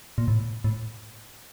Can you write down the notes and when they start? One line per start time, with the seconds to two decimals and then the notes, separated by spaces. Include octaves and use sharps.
0.18 A#2
0.28 A2
0.64 A2